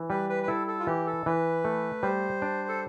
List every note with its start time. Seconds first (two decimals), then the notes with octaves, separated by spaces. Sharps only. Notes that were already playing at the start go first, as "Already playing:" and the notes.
Already playing: E3
0.10 G3 B4
0.30 B4
0.43 B4
0.48 E4 A4
0.67 A4
0.80 F4
0.87 E3 G4
1.07 A4
1.26 E3 B4
1.64 A3
2.02 G3 C5
2.42 D4
2.68 A4